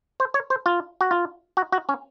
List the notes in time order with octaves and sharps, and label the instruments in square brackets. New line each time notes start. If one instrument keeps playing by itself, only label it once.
[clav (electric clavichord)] C5
C#5
C5
F4
F#4
F4
F#4
F#4
C#4